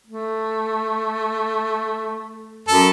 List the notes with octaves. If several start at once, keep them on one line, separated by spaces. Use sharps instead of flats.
A3
F#2 A4